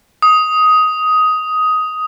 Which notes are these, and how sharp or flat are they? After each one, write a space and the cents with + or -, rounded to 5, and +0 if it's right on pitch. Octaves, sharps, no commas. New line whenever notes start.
D#6 +10